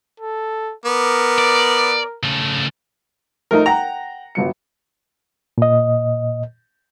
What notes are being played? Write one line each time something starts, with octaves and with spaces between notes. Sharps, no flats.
A4
B3 A#4 D6
D5
C#3 A3
F3 A3 D#4 A#4
F#5 G5 A#5
G1 F#3 C#7
A#2 D#5